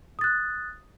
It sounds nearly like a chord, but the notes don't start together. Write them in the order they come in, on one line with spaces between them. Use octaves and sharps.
D#6 A6 F#6